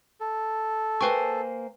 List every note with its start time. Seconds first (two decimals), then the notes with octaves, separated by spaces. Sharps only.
0.20 A4
1.01 A#3 B4 C5 G5 G#5 C#6